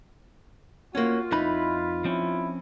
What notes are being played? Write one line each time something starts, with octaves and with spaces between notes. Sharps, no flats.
A#3 C#4 F4 F#4
F2 D#4 E4 B4 B5
F3 C4 C#4 E4